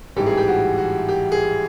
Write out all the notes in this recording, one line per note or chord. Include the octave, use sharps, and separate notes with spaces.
A1 G#2 E3 G3 G4
G#4
G4
F#4
F#4
G4
G#4